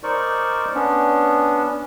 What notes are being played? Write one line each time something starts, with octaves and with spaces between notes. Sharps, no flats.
D#4 A#4 C5 D5 C#6
B3 C#4 D4